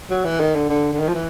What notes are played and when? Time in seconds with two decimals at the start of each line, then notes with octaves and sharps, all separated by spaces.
0.10 F#3
0.25 E3
0.40 D#3
0.55 D3
0.70 D3
0.93 D3
0.99 D#3
1.08 F3
1.14 E3